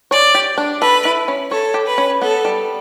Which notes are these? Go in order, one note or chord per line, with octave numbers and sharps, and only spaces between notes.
C#5 D5
G4
D4
A4 B4
E4
C#4
A4 C#5
G4
B4
C#4
B3 A4
G3